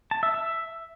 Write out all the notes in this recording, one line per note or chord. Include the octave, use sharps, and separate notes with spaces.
A5
E5
E5